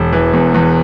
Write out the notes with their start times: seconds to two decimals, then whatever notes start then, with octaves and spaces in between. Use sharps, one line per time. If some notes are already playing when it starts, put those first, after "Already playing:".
Already playing: E1
0.12 E3
0.33 E2
0.54 E2